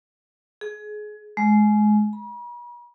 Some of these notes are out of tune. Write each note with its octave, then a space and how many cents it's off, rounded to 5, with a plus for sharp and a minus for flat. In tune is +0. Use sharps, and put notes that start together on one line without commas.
G#4 +25
G#3 +25
B5 -45